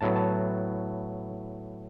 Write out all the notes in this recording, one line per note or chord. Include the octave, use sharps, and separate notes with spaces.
A2 F#3 B3 A5
A5